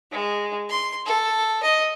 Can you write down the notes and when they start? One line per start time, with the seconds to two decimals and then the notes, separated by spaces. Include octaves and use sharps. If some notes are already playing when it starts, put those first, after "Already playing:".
0.11 G#3
0.69 C6
1.05 A4
1.63 D#5